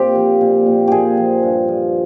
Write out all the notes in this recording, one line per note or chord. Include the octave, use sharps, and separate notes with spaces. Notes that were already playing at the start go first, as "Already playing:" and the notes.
Already playing: A#2 C4 G4
F3
A#2
A#2
A#2 G4 G#4
F3
G2
F3